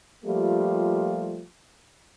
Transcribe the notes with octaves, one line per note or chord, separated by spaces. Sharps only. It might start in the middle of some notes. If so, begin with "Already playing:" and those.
F3 G3 A3 A#3 F4 G4